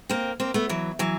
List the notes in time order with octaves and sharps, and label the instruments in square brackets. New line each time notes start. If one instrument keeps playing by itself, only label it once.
[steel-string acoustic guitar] A#3 C4
A#3 C4
A3 B3
E3 F#3
E3 F#3